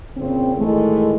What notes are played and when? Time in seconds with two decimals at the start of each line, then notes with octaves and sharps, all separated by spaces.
0.17 A#2 C#3 C4
0.57 A2 D#3 E3 G#3 A3